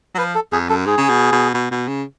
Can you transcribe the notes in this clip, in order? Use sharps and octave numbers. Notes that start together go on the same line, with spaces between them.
F#3
F3 B4
A4
F2 G#4
F#2 A4
G#2 G#4
C#3
B2
B2
B2
B2
C#3